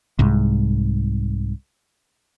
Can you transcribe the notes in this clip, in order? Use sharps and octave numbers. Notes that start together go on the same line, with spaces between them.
C2 G#2